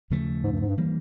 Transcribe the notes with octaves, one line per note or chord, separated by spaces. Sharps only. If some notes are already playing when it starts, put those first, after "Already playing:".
D#2 C#3 F3 A3
G#2
G2
G#2
G2
E3 G3 A#3